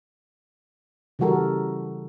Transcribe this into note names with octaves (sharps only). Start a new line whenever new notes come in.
C#3 E3 G3 F#4 A4 A#4